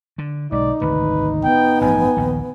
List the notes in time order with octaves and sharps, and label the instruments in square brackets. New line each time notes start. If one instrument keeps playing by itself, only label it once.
[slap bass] D3
[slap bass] B1 G#3 [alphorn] D#4 [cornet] D5
[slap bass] G#1 D2 C3 [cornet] B4
[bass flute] B3 [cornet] G5
[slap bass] A1 G2 F3 [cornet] G#5
[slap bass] A#1 D#2 D#3